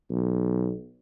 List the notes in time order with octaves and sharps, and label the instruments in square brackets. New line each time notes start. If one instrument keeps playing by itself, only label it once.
[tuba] B1